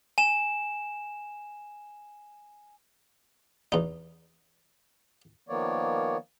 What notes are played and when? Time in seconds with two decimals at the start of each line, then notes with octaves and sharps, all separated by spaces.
0.18 G#5 E7
3.72 E2 D#4
5.49 D#3 F3 A#3 B3 C#5 D5